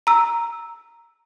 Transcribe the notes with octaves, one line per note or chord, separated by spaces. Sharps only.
A#5 E6